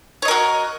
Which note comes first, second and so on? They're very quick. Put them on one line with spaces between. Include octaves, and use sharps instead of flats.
C#5 D#5 A#4 F#4